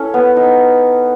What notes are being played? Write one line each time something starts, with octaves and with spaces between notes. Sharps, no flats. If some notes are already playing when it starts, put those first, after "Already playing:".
Already playing: C#4 E4 A4
B3
D#4